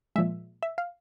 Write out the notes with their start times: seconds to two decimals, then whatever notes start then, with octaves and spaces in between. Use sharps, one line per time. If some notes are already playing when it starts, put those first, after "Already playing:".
0.16 A#2 F3 G#3 E5
0.63 E5
0.78 F5